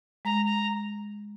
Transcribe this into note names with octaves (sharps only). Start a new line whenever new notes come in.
G#3 A#5
A#5